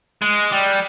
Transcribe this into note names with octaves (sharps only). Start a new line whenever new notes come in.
G#3
G3